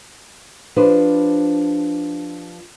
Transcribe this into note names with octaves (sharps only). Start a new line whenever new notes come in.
F3 D4 G4 B4 C5